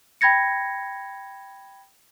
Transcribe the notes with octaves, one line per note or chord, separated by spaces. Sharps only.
G5 B5 G#6 A#6 C#7